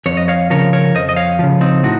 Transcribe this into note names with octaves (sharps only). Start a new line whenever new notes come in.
F2 C#5
D#5
C#5 F5
C#3 F3 A#4 C#5
A#4 C#5
F2 C5 D#5
D#5
C#5 F5
C#3 F3
C4 D#4
A2 D#4 F#4